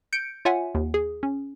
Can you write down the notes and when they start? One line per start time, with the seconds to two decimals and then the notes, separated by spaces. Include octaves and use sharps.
0.13 G6 C#7 D7
0.45 F4 C#5 E5 F#5 G#5
0.75 D#2
0.94 G#4
1.23 C#4